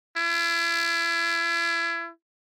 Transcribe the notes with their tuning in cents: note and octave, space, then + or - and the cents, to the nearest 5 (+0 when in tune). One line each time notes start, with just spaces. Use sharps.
E4 +40